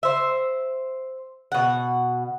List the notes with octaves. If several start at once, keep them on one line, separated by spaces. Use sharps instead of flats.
C5 E5
B2 F#5